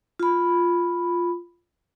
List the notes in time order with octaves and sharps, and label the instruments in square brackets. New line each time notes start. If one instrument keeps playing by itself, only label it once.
[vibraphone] F4 B5